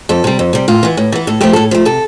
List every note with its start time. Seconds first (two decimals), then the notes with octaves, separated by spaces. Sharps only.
0.09 F2 A4
0.24 C3 G3
0.39 F2
0.53 C3 G3
0.68 A2 F4
0.83 E3 B3
0.97 A2
1.12 E3 B3
1.27 A2 A4
1.41 F3 A3 G4
1.53 A2 A4
1.71 F3 A3
1.85 C3 A4